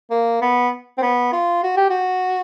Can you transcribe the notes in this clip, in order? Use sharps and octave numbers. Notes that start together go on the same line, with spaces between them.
A#3
B3
C4
B3
F4
F#4
G4
F#4